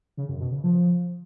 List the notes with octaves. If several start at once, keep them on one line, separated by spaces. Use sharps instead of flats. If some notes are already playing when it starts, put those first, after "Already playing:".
C#3
F#2
B2
C#3
F3